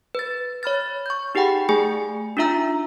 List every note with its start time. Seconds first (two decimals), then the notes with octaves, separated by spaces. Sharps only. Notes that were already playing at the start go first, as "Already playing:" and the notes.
0.15 B4 A6
0.63 C#5 B5 F6 A6
1.06 C#6 G6
1.35 D#4 G4 G#4 F#5 G5 B5
1.69 A3 G#4 G#5
2.37 D4 D#4 F4 E5 A#5 E6